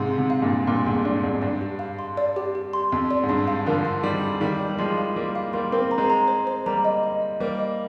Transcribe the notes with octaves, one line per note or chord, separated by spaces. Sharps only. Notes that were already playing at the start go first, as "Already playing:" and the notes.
Already playing: G#2 C3 F5
C6
G#2 C3
F5
G2 A#2
G4
G2 A#2 C6
F2 G#2 G4
G2 D5
F2 G#2 D5
G2 D5
G4
F5
C6
D5
G4
G4
C6
F2 C6
D5
G#2
G2 C6
F5
D3 F3 A#4
C6
D#3 G3 F5
F5
D#3 G3 F5
D5
G3
F3 G#3 C6
F5
G3 A#3 F5
F5
G3 A#3 C6
C4 A#4
A#5
G#3 C4
A#5
C5
C5
G3 A#3 A#5
D#5
D#5
D#5
G3 A#3 C5
D#5